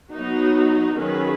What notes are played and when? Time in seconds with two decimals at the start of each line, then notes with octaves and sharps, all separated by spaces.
0.11 F#3 B3 D#4 F#4
0.97 D#3 F#3 C#4 G#4 B4